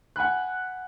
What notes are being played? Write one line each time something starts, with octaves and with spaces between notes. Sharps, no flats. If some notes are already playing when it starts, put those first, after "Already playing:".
F#5 G#5 B5 F#6